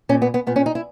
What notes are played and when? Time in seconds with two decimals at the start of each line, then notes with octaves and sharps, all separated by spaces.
0.09 A#2 C#4
0.22 B3
0.34 B3
0.47 A#2 B3
0.56 C#4
0.66 D#4
0.75 E4